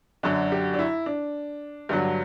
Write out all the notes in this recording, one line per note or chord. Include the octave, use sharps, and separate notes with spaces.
F#2 D3 F#3 D4
G4
D4
E4
D4
G2 D3 F#3